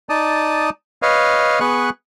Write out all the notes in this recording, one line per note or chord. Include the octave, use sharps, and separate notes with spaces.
D#4 D5 A5 D#6
B4 C#5 D#5 F5
B3 G#4 B4 C#6 F#6